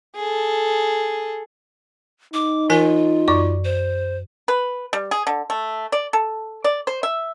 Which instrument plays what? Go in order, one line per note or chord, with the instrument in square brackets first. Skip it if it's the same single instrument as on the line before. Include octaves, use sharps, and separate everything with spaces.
[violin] G#4 A4
[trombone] D#4 [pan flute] D6
[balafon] E3 A#4 G#5 [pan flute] F4
[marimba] F#2 C#6 D6 [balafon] D5
[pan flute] C5
[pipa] B4
G3
G#4
D3
A3
D5
A4
D5
C5
E5